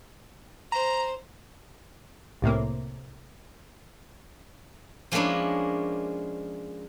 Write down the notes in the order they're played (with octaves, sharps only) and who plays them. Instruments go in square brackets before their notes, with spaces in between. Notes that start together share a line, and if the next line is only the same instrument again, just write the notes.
[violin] C5 [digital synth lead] A#5
[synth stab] C2 A2 C3 A#3
[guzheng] F3 G#3 A#3 C#4 D4 E4